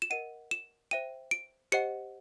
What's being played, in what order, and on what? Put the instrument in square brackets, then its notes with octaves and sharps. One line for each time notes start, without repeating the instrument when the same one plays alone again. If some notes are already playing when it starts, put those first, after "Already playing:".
[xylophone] E7
A#4 D#5 F#5 D#7
E7
C5 E5 G5 D#7
D7
G4 C5 D#5 F#5 C#7